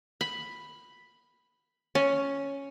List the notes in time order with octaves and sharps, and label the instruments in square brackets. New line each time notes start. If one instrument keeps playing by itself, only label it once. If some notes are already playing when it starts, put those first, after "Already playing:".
[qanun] B5
C#4